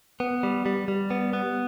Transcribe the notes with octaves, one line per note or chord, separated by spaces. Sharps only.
B3
G3
G3
G3
B3
B3